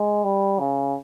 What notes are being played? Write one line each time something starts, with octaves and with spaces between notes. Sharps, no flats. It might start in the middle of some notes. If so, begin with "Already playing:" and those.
Already playing: G#3
G3
C#3